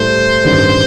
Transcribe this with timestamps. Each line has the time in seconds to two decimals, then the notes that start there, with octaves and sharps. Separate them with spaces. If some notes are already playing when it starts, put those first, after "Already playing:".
Already playing: A2 G3 A4 C5
0.44 A1 G2 D#3 G3